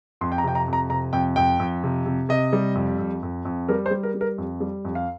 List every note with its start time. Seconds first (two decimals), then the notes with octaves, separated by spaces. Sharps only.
0.21 F2 C6
0.32 G5
0.38 A#5
0.44 C3 G5
0.55 A#5
0.68 F2
0.73 A#5
0.90 C3 A#5
1.13 F2 G5
1.36 F2 G5
1.59 F2
1.83 C3
2.06 C3
2.29 C3 D#5
2.53 G3
2.75 F2
2.99 F2
3.23 F2
3.45 F2
3.68 G3 A#4
3.86 C5
3.91 G3
4.03 A#4
4.14 G3
4.21 A#4
4.38 F2
4.60 G3
4.85 F2
4.95 F5